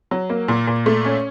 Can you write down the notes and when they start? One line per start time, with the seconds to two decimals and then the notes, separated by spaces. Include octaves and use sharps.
0.11 F#3
0.30 A#3
0.48 A#2
0.67 A#2
0.86 A3
1.05 C#4